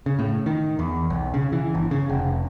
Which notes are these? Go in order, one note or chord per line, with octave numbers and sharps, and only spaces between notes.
C#3
A2
D#3
E2
B1
C#3
E3
G1
C#3
F1